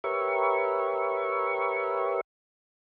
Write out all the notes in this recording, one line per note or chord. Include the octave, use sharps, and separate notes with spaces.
G4 A#4 B4 C#5 E5 C#6